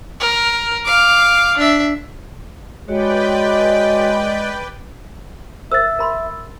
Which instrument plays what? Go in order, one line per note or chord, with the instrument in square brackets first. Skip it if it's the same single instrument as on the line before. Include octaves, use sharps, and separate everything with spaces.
[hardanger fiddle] A#4
F5 D6
D4 E5
[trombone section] G#3 [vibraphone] F#4 C#5 [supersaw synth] B4 D5 G5
[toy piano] A#4 C5 [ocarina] E5 [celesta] E6 A6
[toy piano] A#4 B5 C6